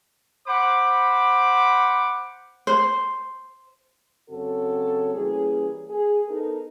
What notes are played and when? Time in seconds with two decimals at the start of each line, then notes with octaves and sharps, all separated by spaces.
0.48 C5 F#5 B5 D6
2.67 C5
4.30 F#2 C#3 C4 F#4 A4 C#5
5.14 E3 G3 A#3 C#4 G#4
5.89 G#4
6.28 B3 D#4 A4 A#4